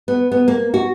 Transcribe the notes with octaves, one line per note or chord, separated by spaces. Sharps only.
B3
B3
A#3
F#4